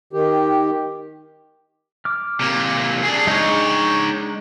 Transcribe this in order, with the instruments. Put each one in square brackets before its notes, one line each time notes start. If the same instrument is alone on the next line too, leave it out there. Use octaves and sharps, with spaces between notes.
[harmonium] D#3 G4
[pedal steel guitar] D6 F6
[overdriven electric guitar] C3 A#3
D4 G#4
[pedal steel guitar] G#3 D4 [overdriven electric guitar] D#4 C#5